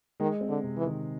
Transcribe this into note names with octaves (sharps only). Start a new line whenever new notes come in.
D#3 G#3
C4
D3
C3
E3
D#3